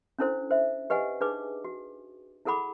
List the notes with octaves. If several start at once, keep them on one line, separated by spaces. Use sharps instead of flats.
C#4 D4 E4 A4 C5
C5 E5
G4 B4 D#5 F#5 G#5
D4 D#4 G#4 B4 D6
F#4
E4 G#4 A4 F#5 B5 D6